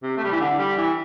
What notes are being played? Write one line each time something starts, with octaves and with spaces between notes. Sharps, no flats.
C3
A3
G3
E3
D3
G3
E3